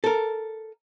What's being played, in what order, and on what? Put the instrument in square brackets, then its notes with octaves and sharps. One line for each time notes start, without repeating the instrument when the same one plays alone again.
[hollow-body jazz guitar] A4 A#4